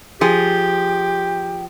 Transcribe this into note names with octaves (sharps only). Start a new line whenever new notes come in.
F3 G4 G#4 G5